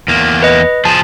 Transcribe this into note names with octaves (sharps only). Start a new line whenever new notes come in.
E2 A#3
B4 D#5
F3 G#4 A5